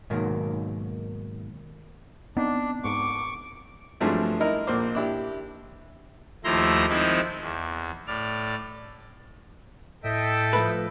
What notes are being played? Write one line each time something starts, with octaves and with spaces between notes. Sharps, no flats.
G#2 B2 D#3 F#3 A#3
B3 C4 D4 D#4
G#2 C#6 D6
G2 F3 F#3 G#3 A3 C4
D#4 E4 A#4 D#5
A#1 A#3 C5 D6
D4 E4 G4
D#2 F3 A3 E4 A#5 C6
D#3 F3 G#3 C4 D#4 E4
E2
A2 D5 F6
A2 A4 D#5 E5 G5
F3 A3 B4